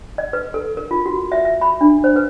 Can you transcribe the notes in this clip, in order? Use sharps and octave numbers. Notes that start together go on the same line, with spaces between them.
D#5
B4
A4
A#4
F4
F#4
E5
E5
B5
D4
C5
B4